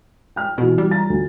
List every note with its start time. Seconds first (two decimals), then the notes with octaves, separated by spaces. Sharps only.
0.36 G5 F6
0.58 B2 E3 F#4
0.78 G3
0.91 A#5 A6
1.10 D2